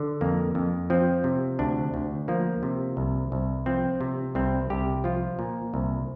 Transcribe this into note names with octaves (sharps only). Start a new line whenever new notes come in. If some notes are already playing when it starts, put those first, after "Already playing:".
Already playing: D3
F2 A#3
F2
F3 C4
C3
D2 D4
D2
F3 A#3
C3
C2
C2
F3 C4
C3
C2 C4
C2 G4
F3 F4
A#2
C2